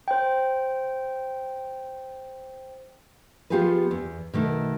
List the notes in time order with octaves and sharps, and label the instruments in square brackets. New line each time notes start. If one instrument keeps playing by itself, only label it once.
[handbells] C5 G5
[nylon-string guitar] F3 B3 F4 G4 G#4 B4
E2
B2 D#3 A3